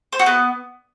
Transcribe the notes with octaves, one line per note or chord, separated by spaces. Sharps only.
C5
F#4
B3